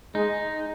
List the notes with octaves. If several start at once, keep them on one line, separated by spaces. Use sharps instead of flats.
G#3 D#4